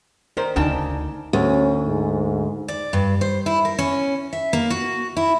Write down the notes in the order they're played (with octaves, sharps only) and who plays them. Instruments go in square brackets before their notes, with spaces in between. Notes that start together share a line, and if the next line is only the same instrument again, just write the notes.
[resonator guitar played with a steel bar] D#3 C5 [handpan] A#4
[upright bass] D2 [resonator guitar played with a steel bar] C#3 G5 A5 [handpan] D4 D#4
[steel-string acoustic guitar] D2 [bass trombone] C#4
[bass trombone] G#2
[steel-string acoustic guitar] D5
G2
C5
E4
A#4
C#4
E5
A#3
F#4
E4